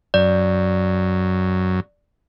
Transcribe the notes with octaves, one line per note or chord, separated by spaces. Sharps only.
F#2 D5